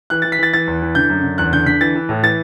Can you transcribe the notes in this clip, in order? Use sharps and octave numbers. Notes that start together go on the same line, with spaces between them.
E3 F#6
E3 A6
B6
E3 A6
E3 A6
E2
E3
D3 G6
F#2
D3
E2 F#6
D3 G6
D3 B6
E3 A6
E3
A2
E3 A6